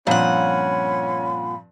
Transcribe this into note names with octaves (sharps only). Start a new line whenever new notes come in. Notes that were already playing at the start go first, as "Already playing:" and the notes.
G2 A#2 F3 C4 C#4 F#5 B5